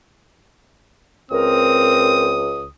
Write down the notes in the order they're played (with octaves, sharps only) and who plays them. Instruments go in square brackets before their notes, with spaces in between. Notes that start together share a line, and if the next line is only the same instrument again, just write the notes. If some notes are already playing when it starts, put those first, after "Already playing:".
[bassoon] C#2 [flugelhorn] C4 [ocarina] A#4 [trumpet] D#6